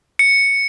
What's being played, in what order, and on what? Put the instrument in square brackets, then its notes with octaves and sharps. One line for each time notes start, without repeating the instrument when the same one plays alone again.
[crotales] C#7